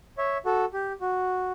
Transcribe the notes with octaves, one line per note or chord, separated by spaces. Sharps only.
C#5 E5
F#4 A4
G4
F#4